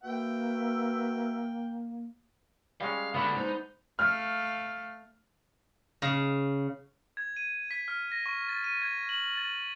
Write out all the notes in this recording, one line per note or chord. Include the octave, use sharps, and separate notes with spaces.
A#3 F#4 B4 E5 G5
G3 G#3 C#4 F5
D3 G#3 B3 D4 F#4 B5
D#4 C5
A3 F5 F6
C#3
G#6
D#7
B6
F6
A#6
C#6
A6
D#7
G#6
F#7
A6